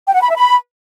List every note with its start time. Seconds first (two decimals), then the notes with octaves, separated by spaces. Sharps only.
0.07 G5
0.14 F#5
0.22 B5
0.29 E5
0.36 B5